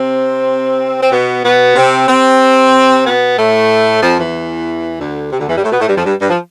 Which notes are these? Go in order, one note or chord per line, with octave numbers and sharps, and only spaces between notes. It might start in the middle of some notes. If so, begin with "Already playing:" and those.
Already playing: C3 C4
C4
B2 B3
B2 B3
C3 C4
C3 C4
B2 B3
A2 A3
F2 F3
E2 E3
D2 D3
C3
D2 D3
E2 E3
G2 G3
A2 A3
B2 B3
A2 A3
G2 G3
F2 F3
G2 G3
G2 G3
F3